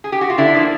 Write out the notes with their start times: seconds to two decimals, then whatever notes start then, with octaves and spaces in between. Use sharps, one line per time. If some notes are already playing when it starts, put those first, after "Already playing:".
0.04 G#4
0.12 G4
0.21 F#4
0.30 F4
0.38 D3 D4 E4
0.54 F3 A#3